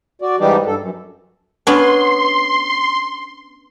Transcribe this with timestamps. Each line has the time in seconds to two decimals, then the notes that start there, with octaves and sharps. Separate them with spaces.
0.22 F#4 D5
0.40 G#2 E3 G3 D4 D#4 G4
0.66 G2 A4
0.79 F#2
1.67 B3 C#4 D4 C6